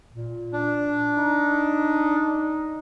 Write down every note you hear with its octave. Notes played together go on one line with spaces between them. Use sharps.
A#2
D4
D#4